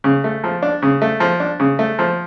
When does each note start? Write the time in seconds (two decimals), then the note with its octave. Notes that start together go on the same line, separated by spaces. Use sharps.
0.04 C#3
0.24 A3
0.44 F3
0.62 D4
0.82 C#3
1.02 A3
1.20 F3
1.40 D4
1.60 C#3
1.79 A3
1.99 F3